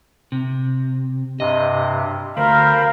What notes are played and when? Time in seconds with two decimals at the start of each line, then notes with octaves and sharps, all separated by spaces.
0.32 C3
1.40 G2 C3 D#5
2.37 D2 A#4 C5 F5 G5 B5